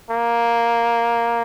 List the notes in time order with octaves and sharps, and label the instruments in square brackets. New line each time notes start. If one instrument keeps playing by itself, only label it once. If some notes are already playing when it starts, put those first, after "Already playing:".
[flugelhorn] A#3